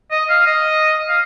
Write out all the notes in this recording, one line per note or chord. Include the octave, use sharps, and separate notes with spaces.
D#5
F5
D#5
F5